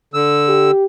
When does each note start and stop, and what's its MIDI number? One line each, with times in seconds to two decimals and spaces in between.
0.14 0.71 50
0.14 0.71 88
0.48 0.86 67